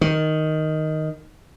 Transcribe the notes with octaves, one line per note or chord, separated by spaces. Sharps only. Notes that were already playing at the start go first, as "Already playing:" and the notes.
D#3